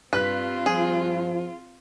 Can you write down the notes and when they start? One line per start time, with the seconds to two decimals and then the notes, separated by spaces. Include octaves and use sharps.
0.13 G2 C4 F4 B4 F#6 B6
0.66 F3 G#4